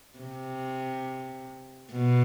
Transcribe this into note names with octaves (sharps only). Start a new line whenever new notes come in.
C3
B2